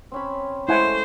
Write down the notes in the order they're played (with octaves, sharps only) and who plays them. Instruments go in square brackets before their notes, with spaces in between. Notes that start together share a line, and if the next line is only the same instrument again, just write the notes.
[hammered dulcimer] C4 C#4 B5
[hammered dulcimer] G#3 A3 B5 [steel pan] E4 F#5 G#5 [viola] C5